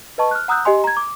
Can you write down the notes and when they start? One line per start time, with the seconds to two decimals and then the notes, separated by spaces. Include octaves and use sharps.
0.18 B4 D#5 A5 C#6
0.31 F6 F#6
0.48 F#5 A#5 D#6 E6 F#6 G6
0.65 G4 D#5 G#5 C6
0.84 A#5 G#6
0.97 D6